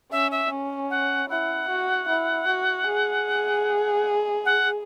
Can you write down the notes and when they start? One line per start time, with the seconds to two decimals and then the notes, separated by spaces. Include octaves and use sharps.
0.11 C#4 E5
0.31 E5
0.51 C#4
0.90 F#5
1.30 E4 F#5
1.69 F#4
2.09 E4
2.48 F#4
2.87 G#4
4.45 F#5